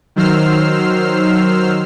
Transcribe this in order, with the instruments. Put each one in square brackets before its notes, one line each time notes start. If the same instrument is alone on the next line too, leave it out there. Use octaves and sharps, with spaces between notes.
[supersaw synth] D#3 F#3 C5 E6 F6 C7